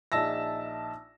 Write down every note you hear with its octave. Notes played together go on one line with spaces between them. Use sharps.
A#1 D#4 E5 A5 E6 A#6